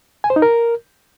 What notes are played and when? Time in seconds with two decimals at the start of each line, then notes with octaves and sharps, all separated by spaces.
0.24 G#5
0.30 C5
0.36 D#4
0.42 A#4